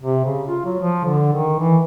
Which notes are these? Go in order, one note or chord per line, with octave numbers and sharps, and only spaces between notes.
C3
C#3
F4
F#3
F3
D3
D#3
E3